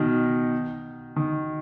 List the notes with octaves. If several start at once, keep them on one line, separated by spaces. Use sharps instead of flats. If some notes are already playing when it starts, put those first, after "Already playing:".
Already playing: B2 D#3
D#3